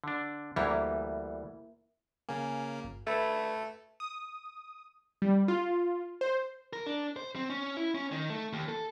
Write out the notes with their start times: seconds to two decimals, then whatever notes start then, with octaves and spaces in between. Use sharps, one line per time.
0.04 D3 D4
0.56 D2 E3 G3 A#3 E4
2.29 C#3 A#3 G#5
2.84 G1
3.07 A3 A4 B4 B5 G#6
4.00 D#6
5.22 G3
5.48 F4
6.21 C5
6.73 A#4
6.86 D4
7.16 C5
7.36 C4
7.50 C#4
7.77 E4
7.95 C#4
8.12 D#3
8.30 A3
8.53 D#2
8.69 A4